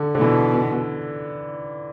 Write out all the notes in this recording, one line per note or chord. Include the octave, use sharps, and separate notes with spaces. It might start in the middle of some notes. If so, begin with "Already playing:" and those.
Already playing: D3
D3
B2 E3